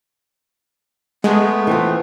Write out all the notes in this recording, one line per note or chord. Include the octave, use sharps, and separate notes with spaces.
G#3 A3 B3
E3 C4 F4